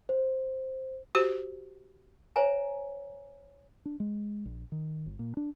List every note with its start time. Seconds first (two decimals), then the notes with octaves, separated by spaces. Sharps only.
0.09 C5
1.15 F#4 G4 C5
2.36 C5 C#5 E5 G#5 A#5
3.85 D4
4.00 G#3
4.45 A#1
4.72 D#3
5.06 G1
5.19 A#2
5.37 D4